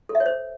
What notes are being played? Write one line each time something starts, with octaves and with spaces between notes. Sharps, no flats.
A4
E5
C#5
C5